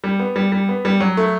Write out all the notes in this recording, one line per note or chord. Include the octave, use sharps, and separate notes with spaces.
G3
B3
G3
G3
B3
G3
F#3
A3